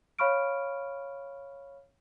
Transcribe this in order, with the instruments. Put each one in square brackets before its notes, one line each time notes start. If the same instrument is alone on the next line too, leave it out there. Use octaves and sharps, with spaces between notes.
[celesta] C#5 F5 B5 C#6 F6 D7